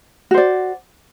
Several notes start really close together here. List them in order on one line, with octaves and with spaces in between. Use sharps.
F#4 C5 D5